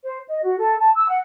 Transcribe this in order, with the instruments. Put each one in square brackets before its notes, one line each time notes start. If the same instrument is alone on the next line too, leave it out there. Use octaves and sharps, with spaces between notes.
[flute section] C5
D#5
F#4
A4
A5
E6
F#5